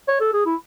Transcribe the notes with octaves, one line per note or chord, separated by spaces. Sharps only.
C#5
A4
G#4
E4